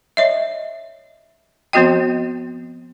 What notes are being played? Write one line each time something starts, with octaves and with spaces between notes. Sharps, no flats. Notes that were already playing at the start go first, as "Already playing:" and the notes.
C#5 D#5 E5
F3 B3 C4 F#4 D#5 G5